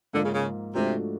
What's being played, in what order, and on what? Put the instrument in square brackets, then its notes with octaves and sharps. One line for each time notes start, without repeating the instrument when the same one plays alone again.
[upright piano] G#2 F3 A#3 [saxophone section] D3
[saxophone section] C#3
C#3
[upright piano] G#2 F3 A3 D4 F#4 [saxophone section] C3